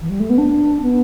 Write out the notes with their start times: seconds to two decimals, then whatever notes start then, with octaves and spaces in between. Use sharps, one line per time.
0.01 E3
0.10 G3
0.20 A3
0.30 B3
0.38 D4
0.82 B3